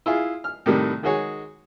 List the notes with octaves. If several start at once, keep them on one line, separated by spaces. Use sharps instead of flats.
E4 F4 G#4
F6
A2 C3 D#3 G3
D#3 G#3 F#4 G#4 C#5